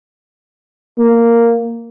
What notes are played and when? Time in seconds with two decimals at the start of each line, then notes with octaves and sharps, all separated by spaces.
0.98 A#3